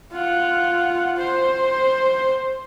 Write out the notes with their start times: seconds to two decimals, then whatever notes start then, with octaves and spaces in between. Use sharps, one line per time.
0.12 F4 F#5
1.17 C5